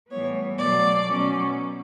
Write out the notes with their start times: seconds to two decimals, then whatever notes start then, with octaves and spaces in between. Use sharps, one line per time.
0.11 A2 E3 G3 B3 C#5
0.58 B2 F#3 A3 D5
1.07 B2 F#3 C#4